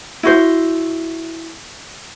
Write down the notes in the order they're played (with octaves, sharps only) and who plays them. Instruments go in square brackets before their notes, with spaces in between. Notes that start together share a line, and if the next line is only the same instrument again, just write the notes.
[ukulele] E4 F#4 C5